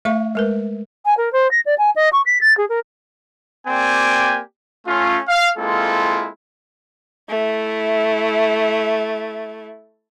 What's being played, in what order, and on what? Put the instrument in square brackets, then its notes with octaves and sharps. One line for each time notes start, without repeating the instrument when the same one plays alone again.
[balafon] A3 E5 F5 C#6
G#3 A#4 B4
[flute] G#5
A#4
C5
A#6
D5
G#5
D#5
C#6
B6
A6
G#4
A#4
[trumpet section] A#3 C4 G4 D5 G5 G#5
A3 C#4 F4
F5
G#3 A#3 C4 E4 F4 A4
[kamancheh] A3 E4